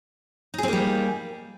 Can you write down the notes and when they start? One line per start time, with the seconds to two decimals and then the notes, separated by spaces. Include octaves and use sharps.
0.54 D#4
0.58 G#4
0.63 C4
0.68 A#3
0.73 G3